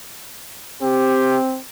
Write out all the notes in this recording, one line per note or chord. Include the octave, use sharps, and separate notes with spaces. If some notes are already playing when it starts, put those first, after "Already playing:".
C4 G4